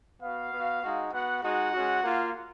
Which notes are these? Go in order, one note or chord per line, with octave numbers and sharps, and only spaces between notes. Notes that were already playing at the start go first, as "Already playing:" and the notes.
B3 F#4 F5
B3 F#4
G#3 D#4 F#4
B3 F#4 F#5
G#3 D#4 F#4 F#5
G#3 C#4 F#4
A#3 F4